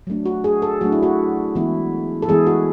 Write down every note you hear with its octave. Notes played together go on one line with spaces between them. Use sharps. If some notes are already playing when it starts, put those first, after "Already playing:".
F#3 A3 D4
F#4
G#4
A4
F#3 A3 D4 F#4
E4
F#4
E3 G#3 B3 E4
A4
E3 G#3 B3 E4 G#4
F#4